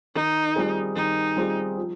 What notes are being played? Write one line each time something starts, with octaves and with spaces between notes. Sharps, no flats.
D#3 D#4
G3 C4 F4 G#4
D#3 D#4
G3 C4 F4 G#4
F3